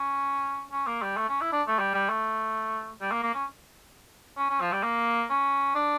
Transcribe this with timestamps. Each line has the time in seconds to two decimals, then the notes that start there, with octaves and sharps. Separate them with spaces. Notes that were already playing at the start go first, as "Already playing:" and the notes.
Already playing: C#4
0.71 C#4
0.87 A#3
1.02 G3
1.17 A3
1.29 C#4
1.41 E4
1.52 D4
1.67 A3
1.79 G3
1.94 G3
2.09 A3
3.01 G3
3.11 A#3
3.23 A#3
3.34 C#4
4.37 C#4
4.50 C#4
4.61 F3
4.72 G3
4.83 A#3
5.30 C#4
5.75 D4